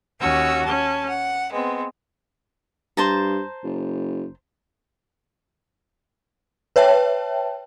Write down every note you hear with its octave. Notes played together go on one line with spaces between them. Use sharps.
D#2 C#4 F#4 E6
C#4 A5
F#5
G#3 B3 C4
G2 C5 A5 A#5
F#1
B4 C#5 E5 G5 A5